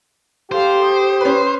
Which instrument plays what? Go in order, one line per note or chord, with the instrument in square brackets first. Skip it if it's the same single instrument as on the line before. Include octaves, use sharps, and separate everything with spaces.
[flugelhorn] G4 [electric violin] A4 F5 [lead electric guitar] C5
[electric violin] D#6
[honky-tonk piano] C#4 B4